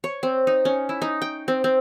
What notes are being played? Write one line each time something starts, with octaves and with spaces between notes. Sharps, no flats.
C#5
C4
D#4
C#4
E4
D#4
G5
C4
C4